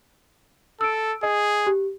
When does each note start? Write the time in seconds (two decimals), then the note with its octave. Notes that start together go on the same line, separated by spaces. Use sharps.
0.81 A4 E6 D7
1.23 G#4 D#5
1.66 G4